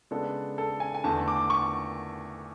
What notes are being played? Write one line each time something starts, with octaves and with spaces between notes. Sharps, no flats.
C#3 G#3 B3 D4 A4
A4
G#5
G#5
E2 D3 A3 A5
D6
C#6